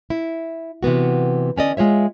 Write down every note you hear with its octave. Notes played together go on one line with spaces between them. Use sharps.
E4
C3 E3 B3 F#4
D3 C#4 D5 D#5
G#3 F4 C#5 E5